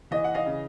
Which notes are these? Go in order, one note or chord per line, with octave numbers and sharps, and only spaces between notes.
E3 D#5
F#5
D#5 F5
C#3